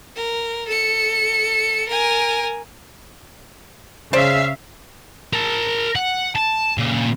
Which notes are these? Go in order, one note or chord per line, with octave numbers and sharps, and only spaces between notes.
A#4
A4 C#7
A#4 G#5
C#3 C5 D5 E5 F5
A#4 A5
F#5
A5
A#2 C#3